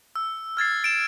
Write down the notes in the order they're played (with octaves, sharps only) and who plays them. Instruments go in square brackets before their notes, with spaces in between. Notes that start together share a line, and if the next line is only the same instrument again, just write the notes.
[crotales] E6
F6 G#6 A6 C7
A6 D7 E7